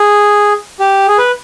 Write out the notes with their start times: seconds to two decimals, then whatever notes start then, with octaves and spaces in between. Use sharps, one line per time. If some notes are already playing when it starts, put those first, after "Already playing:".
Already playing: G#4
0.80 G4
1.08 G#4
1.18 B4